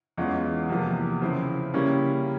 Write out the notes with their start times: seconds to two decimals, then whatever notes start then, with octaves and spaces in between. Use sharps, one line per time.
0.17 E2 E3 G#3 C#4 F4
0.69 E2 C3 F3 A#3
1.21 C#3 F3 C4 E4
1.74 C#3 G3 A#3 C#4 E4